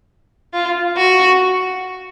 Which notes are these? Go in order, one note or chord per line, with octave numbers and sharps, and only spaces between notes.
F4
F#4